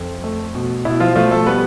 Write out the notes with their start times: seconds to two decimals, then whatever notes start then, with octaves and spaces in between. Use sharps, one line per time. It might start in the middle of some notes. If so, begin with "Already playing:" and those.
Already playing: F2 A4
0.24 A3
0.55 B2
0.85 B2 E4
1.00 F3 F4
1.15 F3 A3 F4
1.31 A3 A4
1.46 G3 B3 B4